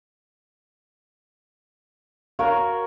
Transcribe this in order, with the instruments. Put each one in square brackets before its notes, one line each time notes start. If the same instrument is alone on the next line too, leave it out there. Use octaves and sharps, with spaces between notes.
[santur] F#4 A#4 C#5 [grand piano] F5